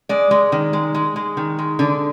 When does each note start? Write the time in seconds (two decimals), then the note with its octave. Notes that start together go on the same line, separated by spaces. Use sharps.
0.09 G#3 D5
0.31 G#3
0.52 D#3
0.73 G#3
0.94 G#3
1.16 G#3
1.37 D#3
1.59 G#3
1.79 D3